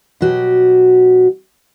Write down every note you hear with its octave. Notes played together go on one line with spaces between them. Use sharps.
B2 F#3 F#4 G4